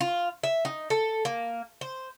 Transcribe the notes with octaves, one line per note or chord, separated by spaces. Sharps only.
F4
E5
D#4
A4
A#3
C5